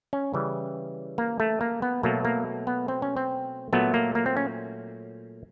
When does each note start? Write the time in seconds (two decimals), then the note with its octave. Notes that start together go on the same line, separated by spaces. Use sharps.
0.13 C#4
0.34 C#3 E3 G3
1.18 A#3
1.40 A3
1.61 A#3
1.82 B3
2.03 B2 F#3 A3 A#3
2.25 A#3
2.67 B3
2.88 C4
3.02 C#4
3.17 C4
3.73 A#2 F#3 A3 B3
3.94 A#3
4.15 A#3
4.26 C4
4.37 C#4